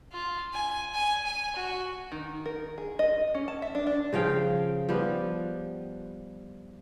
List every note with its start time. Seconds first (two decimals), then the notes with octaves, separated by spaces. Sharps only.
0.12 F4
0.53 G#5
0.93 G#5
1.26 G#5
1.56 F#4
2.12 D#3
2.46 A#4
2.78 G#4
2.99 D#5
3.34 C#4
3.48 A5
3.62 E5
3.75 D4
3.87 D4
4.13 C#3 F3 F5 G5
4.89 F3 G3 B3